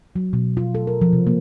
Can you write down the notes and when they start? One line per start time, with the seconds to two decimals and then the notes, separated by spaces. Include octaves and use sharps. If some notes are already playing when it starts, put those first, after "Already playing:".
0.16 F#3
0.33 B2
0.57 F4
0.75 A4
0.87 A#4
1.01 F3
1.13 C3
1.27 A#3